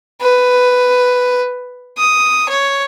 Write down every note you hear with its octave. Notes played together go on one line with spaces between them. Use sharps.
B4
D#6
C#5